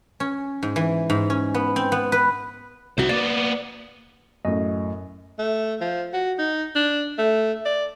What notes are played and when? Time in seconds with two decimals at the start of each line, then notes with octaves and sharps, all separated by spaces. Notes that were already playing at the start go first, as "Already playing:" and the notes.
0.20 C#4
0.63 G#2
0.76 E3
1.10 G#2
1.30 C#4
1.54 B3
1.76 C4
1.92 B3
2.12 B4
2.98 C2 F#4 C5 F#5
3.09 A#3 B3 D5
4.45 F#2 A2 D#5
5.39 A3
5.81 F3
6.13 F#4
6.39 D#4
6.75 D4
7.18 A3
7.66 D5